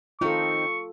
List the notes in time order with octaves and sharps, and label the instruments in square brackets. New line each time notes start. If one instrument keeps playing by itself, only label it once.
[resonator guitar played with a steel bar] D#3 C4 D#4 [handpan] F4 A4 [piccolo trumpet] C#6